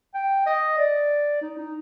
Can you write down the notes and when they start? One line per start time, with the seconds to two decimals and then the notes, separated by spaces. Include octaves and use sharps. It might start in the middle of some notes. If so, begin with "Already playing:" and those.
0.14 G5
0.46 D#5
0.78 D5
1.42 D#4
1.58 D#4